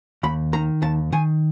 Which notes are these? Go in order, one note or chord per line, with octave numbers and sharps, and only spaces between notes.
D#2 B5
D#3 A#5
D#2 A5
D#3 G#5